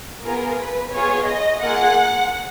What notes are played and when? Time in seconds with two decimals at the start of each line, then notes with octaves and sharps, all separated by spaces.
0.25 B3 F4 G#4 A#4
0.59 B4
0.93 B3 F4 G#4 C#5
1.28 D#5
1.61 A#3 F4 G#4 F#5